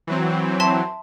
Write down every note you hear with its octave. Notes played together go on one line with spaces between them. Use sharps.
E3 F#3 C4
E5 A5 C6